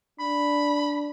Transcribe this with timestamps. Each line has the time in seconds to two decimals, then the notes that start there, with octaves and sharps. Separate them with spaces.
0.19 D4 B5